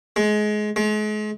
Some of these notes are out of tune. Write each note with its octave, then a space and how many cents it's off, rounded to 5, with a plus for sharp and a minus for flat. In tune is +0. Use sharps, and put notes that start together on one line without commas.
G#3 +25
G#3 +40